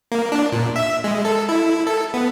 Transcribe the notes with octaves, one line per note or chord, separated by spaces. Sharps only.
A#3
D4
A#2
E5
G#3
A4
E4
A4
B3